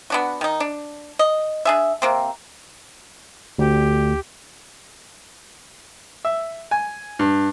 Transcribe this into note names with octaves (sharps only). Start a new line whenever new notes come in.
B3 D4 F#4
D#3 D#4
D4
D#5
D4 G#4 E5
C3 A#3 C4
D2 G4
E5
G#5
G2